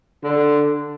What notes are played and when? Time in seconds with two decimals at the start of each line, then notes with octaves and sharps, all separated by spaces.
0.23 D3